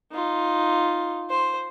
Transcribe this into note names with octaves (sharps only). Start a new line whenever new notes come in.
D#4 F4
C5